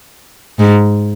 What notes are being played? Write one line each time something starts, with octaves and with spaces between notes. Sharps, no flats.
G#2